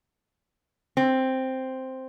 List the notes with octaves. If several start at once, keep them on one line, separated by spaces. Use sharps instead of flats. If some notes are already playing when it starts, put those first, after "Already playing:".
C4